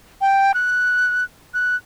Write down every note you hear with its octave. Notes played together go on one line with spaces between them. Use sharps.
G5
F#6
F#6